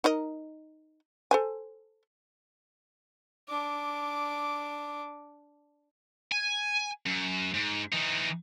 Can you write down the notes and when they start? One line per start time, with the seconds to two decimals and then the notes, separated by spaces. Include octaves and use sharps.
0.04 D#4 A#4 D#5
1.31 A4 C5 G#5
3.49 D4 D6
6.32 G#5
7.06 F#2
7.54 G#2
7.93 E3 D#4